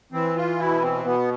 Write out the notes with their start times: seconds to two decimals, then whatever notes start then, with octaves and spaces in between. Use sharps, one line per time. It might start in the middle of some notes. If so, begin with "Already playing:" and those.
0.12 E3 C4
0.36 F4
0.59 B2 E4
0.81 C4
1.05 B2 B3